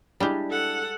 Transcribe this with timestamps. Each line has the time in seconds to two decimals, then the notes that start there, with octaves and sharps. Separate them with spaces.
0.20 G3 G#3 D4 E4 G4
0.51 A4 F#5